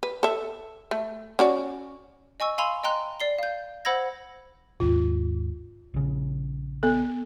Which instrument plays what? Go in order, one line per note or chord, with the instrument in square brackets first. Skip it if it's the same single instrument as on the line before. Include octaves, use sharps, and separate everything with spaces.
[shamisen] B4
A4 E5
A3
C#4 F#4 D5
[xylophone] D#5 G#5 C#6 E6
F5 G#5 B5 C6 E6 F7
D#5 G5 A#5 C6 F#6
D5 C7 G7
F5 G6
C5 F#5 B5 E6 G#6 A#6
[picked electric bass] G#1 D#2 G#2 [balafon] F4
[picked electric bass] A#1 C#3
[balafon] B3 A4